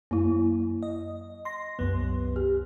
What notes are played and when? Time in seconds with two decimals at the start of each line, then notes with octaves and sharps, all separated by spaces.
0.11 F#2 A#3 E4
0.83 D#5
1.45 C6 A#6
1.79 C2 F#2 B3
2.36 G4